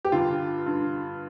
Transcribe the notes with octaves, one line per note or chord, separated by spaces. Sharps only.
G4
G2 D3 F4
G2 D3